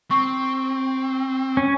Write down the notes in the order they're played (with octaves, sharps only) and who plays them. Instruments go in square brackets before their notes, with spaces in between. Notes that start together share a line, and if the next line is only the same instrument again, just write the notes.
[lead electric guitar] C4 [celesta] C#6
[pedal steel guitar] C#4